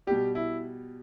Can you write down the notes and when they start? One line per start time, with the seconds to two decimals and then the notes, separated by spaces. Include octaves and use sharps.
0.07 B2 G3 G4
0.35 E4